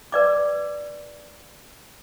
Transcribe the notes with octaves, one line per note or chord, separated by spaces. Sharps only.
B4 D5 D6